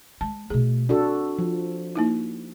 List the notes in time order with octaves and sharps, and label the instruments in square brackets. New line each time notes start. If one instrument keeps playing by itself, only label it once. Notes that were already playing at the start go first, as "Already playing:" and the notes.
[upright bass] G#3 [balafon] A5
[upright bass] B2 A3 [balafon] G#4
[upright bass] C4 [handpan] D4 F#4 A4
[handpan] F3
[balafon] A#3 D#4 E4